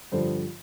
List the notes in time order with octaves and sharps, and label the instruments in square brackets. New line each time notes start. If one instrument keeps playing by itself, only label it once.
[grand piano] G2 D3 F3 C5